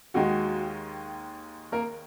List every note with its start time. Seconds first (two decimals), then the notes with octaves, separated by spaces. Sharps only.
0.14 D#2 D#3 G#3 F#4
1.72 A#3 A#4